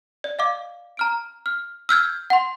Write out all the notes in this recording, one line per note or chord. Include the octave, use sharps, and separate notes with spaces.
D5
D#5 F5 D6
A#5 F6 D7
F6
E6 F6 G6 G#6
F#5 C6